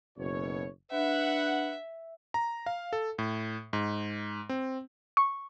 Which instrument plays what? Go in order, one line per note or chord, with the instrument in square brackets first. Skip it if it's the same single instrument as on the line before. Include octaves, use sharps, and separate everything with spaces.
[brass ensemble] F#1 B2 C#5
[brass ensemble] D4 B4 F#5 [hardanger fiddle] E5
[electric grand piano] A#5
F5
A4
A2
G#2
C4
[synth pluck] C#6